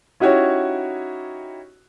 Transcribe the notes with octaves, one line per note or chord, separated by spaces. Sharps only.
C#4 D#4 E4 F#4 G4 C#5